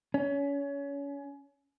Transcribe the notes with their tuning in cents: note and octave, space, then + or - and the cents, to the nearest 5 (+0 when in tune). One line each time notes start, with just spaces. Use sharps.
C#4 +30